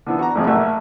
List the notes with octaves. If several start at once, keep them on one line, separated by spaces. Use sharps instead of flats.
D3 E3 B3
F#4 D5 A#5
A1 C3 F3 F#3 G#4
A1 A3 A#3 E5 F#5